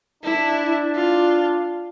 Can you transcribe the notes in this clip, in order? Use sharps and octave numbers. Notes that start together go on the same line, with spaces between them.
D4 E4
F4